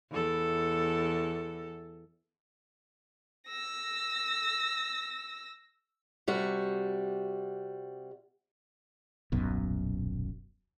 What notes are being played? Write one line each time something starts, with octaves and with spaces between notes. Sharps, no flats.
E2 A4
E6 A#6
C3 G3 F#4
D#1 B1 F#2 B2